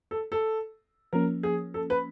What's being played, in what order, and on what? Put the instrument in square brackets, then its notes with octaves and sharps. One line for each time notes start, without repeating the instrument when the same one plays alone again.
[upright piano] A4
A4
[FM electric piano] F3 A#3 C#4 [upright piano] A#4
[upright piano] G#4
A4
B4